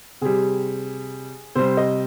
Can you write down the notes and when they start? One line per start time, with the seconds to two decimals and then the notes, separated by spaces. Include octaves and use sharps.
0.21 C3 G3 G#4
1.56 C3 G3 C5
1.77 D#5